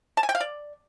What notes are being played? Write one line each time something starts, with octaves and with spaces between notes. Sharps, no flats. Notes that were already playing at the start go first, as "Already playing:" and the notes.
A5
G#5
G5
F5
D5